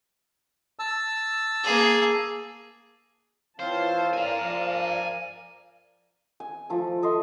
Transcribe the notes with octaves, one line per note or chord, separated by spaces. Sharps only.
A5 E6
A#3 G#4
E3 C4 F4 C5 C#5 F5 A5
A#4 D5 F5 G#5 A#5
F3
G#5
F3 A3 A4
A4 D#5 E5 C6